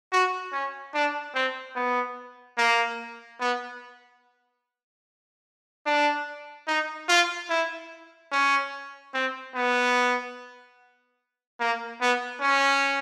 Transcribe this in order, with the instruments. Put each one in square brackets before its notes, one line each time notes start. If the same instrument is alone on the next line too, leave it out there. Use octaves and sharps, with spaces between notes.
[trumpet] F#4
C#4
D4
C4
B3
A#3
B3
D4
D#4
F4
E4
C#4
C4
B3
A#3
B3
C#4